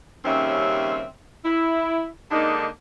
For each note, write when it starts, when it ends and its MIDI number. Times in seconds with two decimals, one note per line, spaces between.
0.24 1.05 39
0.24 1.05 49
0.24 1.05 55
0.24 1.05 60
0.24 1.05 61
0.24 1.05 76
1.44 2.06 64
2.30 2.66 50
2.30 2.66 56
2.30 2.66 58
2.30 2.66 62
2.30 2.66 63